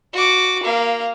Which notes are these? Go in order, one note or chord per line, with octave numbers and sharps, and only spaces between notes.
F#4 D6
A#3 F5